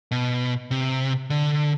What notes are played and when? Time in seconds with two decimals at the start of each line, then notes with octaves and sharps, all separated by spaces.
0.11 B2
0.71 C3
1.30 D3